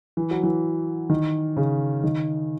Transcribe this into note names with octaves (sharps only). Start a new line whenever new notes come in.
E3
F#3
E3
D#3
C#3
D#3